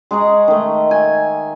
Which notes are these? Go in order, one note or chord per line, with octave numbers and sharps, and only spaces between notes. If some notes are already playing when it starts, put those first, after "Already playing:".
G#3 G#4 A#5 C#6
D#3 A3
G#5